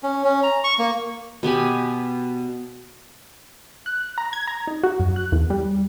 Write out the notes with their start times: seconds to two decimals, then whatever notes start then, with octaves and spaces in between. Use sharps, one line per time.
0.03 C#4
0.24 C#4
0.43 A#5
0.64 C#6
0.79 A#3
1.43 B2 B3 G4 G#5
3.86 F#6
4.18 A#5
4.33 G#6
4.47 A#5
4.67 D#4
4.83 F#4
5.00 F#2
5.16 F#6
5.32 E2
5.50 G3